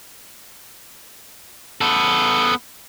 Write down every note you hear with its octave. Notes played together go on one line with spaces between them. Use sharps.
B3 A4